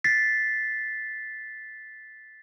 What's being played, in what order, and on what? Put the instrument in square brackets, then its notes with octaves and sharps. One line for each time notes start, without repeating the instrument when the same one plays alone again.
[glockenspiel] A6 B6 C7